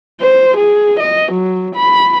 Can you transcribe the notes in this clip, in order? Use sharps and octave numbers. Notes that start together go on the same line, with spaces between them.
C5
G#4
D#5
F#3
B5